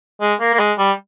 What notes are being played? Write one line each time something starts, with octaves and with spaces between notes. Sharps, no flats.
G#3
A#3
A#3
G#3
G3